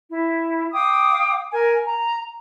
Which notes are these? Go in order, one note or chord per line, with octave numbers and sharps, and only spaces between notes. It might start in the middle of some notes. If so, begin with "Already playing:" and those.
E4
F5 G5 D6 D#6
A#4 G#5
A#5